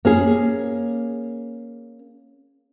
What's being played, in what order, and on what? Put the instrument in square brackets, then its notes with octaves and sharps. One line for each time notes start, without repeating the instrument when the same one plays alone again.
[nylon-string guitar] A#3 C#4 G#4